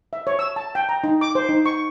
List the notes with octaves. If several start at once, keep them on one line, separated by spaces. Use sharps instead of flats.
E5
C#5
E6
A5
G5
A#5
D#4
D6
C5
D#4
C#6